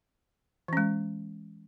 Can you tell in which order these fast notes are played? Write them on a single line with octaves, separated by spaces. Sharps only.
E3 C#4 G#3